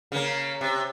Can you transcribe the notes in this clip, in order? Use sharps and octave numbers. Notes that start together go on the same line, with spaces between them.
C#3 A#3
C3